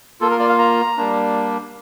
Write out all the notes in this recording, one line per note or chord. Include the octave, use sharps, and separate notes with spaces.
A#3 F4 A4
A#4
D5
F5
A#5
G3 A#3 D4